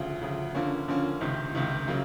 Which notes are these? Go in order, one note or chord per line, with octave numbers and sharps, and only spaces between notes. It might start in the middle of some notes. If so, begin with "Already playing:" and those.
Already playing: D2 C#3 F3
D2 C#3 F3
D3 F3 A#3 C#4
D3 F3 A#3 C#4
C#2 C3 D#3
C#2 C3 D#3
C#3 F#3 A#3